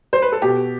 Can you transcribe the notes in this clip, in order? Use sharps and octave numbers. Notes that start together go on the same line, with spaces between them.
C5
B4
A4
B2 G4